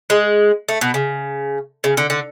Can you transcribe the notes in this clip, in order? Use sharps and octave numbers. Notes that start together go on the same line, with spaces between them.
G#3
A3
B2
C#3
C#3
D3
D3